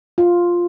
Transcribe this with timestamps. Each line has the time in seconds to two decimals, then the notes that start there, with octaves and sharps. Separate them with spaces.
0.18 F4